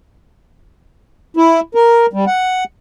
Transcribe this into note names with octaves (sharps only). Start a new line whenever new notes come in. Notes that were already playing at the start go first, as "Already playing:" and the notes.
E4
A#4
G3
F#5